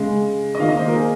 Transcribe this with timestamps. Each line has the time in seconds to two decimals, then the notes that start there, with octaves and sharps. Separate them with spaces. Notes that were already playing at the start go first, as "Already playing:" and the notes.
Already playing: C#3 G#3
0.55 D#5
0.59 D#3 A#3 F5
0.69 D#5
0.79 C5
0.88 A#4
0.96 G#4